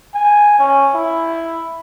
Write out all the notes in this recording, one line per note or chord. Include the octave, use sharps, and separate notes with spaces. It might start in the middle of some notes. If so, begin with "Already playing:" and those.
G#5
C#4
E4